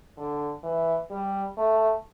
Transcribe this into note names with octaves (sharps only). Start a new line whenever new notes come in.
D3
E3
G3
A3